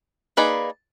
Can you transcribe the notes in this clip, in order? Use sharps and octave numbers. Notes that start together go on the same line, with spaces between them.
A#3 D#4 G#4 B4 D5